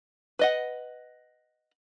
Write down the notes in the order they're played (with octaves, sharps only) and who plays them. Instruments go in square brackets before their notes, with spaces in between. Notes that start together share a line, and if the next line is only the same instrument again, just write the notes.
[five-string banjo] B4 D#5 F#5